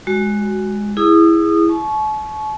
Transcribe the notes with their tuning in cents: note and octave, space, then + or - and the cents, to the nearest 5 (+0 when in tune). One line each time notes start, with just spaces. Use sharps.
G#3 +0 F#4 +10
E4 +0 G#4 -10 D#6 -25
A5 -40 C#6 +0